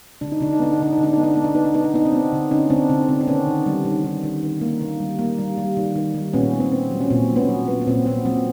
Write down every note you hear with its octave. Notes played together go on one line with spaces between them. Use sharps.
D3 D4
D#4
D3 D4
D#4
B3 D4
D#4
D3 D4
D#4
D3
D4
B3 D#4
D4
B3 D#4
D4
B3 D#4
D4
B3 D#4
D4
B3 D#4
C4 D4
B3
D3
D3 C#4 D#4
D3 C4 D4
D3 C4
D3 C4
D4
D#3 B3 C#4
D#3
G3
D#3
D#3
D#3
D#3
A#3
D#3
G3
A#3
G3
G3
D#3
D#3
G3
A#2 B3 C#4
B3
C4
B3
F#3
C#4
A#2 C4
F#3
B3 C#4
F#3
B3
B3
A#2 C4
A#2 B3
F#3 C4